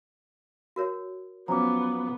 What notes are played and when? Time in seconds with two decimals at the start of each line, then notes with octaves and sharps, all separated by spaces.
0.76 F#4 A#4 C#5
1.48 F3 F#3 B3 C#4 A#5 D6